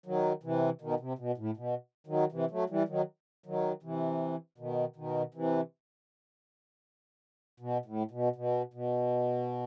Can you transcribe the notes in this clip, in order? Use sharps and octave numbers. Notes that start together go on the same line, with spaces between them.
D#3 F#3
C3 E3
B2 D#3
C3
B2
A2
B2
D#3 F#3
C3 E3
F#3 A3
E3 G3
D#3 F#3
D#3 F#3
C3 E3
B2 D#3
B2 D#3
C3 E3
B2
A2
B2
B2
B2